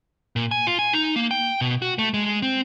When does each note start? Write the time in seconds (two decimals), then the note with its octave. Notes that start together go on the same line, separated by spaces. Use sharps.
0.36 A#2
0.51 G#5
0.67 F4
0.79 G#5
0.93 D#4
1.16 A#3
1.31 G5
1.61 B2
1.82 F#4
1.98 A3
2.14 G#3
2.42 C4